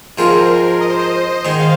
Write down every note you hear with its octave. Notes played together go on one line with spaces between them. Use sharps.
G#2 F3 G#3 C4 F4 A#4
D#5
C5
D#5
G#2 D#3 G#3 D#4 C5
F5